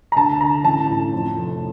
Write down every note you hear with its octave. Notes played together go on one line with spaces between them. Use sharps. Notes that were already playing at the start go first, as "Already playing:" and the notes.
A#5
D2 A5
D3 A#5
A1 A5
A2
F2
F1